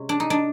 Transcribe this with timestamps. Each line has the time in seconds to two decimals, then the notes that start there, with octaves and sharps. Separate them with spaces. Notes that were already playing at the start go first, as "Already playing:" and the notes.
Already playing: C3 G#3 C#4
0.09 D4
0.20 D#4
0.30 D4